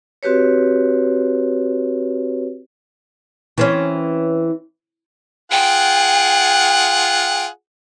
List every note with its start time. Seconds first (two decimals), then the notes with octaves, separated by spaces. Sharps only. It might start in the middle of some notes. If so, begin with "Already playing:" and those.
0.23 C4 F#4 G4 B4 C#5
3.58 E3 C4 C#4
5.52 F4 G#4 F#5 G5